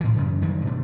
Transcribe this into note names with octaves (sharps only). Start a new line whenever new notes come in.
A2 E3
F#2 C#3 E3
G2 D#3 F#3 G3
B2 D3 A3